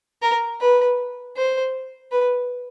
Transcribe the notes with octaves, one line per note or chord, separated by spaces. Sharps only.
A#4
B4
C5
B4